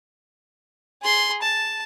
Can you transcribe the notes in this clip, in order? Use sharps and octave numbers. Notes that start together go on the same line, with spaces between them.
G#4 C6
A5